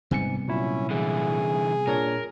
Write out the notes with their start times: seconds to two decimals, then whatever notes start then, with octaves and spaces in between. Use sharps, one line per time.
0.11 G#2 C3 G3 B3 G#5 C#7
0.48 A#2 F#3 C#4 E4
0.90 D3 E3 G#4
1.87 A#2 D4 A#4 C#5